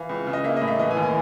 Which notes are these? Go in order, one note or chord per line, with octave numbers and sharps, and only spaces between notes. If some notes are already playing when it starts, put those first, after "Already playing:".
Already playing: E3 F5
C#2
C#3
D#5
A#3 E5
D#5
A2
E5
E3 D#5
G#5
D#2
G#5